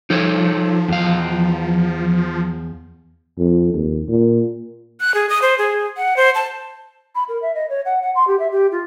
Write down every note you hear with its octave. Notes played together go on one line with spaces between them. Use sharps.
F3 D#4 A4 C#5
E2 F5
F2
D#2
A#2
F#6
G#4
D#6
C5
G#4
F#5
C5
A5
B5
A#4
E5
D#5
C#5
F#5
F#5
C6
G4
E5
G4
F4